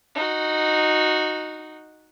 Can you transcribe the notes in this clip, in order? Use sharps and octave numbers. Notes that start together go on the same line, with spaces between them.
D#4 F#4